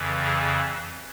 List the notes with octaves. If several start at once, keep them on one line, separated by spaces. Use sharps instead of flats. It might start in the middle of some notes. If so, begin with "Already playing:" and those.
Already playing: F2 C#3 E3
G#4